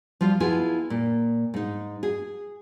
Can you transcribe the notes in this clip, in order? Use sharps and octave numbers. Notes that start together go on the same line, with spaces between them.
F3 G3 F4
B3 E4 F4 G#4 G#5 A5
A#2
G#2 D#4
G#4